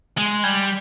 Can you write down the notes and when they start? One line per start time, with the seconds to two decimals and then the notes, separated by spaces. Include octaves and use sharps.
0.18 G#3
0.44 G3